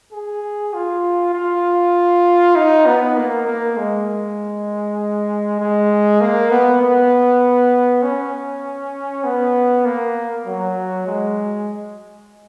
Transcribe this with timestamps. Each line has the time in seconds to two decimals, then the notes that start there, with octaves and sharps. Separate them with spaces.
0.12 G#4
0.74 F4
1.34 F4
2.56 D#4
2.86 B3
3.17 A#3
3.47 A#3
3.77 G#3
5.60 G#3
6.21 A#3
6.51 B3
6.81 B3
8.02 C#4
9.24 B3
9.85 A#3
10.46 F#3
11.06 G#3